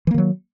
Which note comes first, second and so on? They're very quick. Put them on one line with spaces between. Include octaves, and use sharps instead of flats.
E3 A#3 D#3 F#3